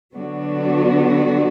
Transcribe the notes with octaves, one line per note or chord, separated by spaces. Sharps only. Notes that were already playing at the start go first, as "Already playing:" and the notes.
D3 F#3 B3 D4 F#4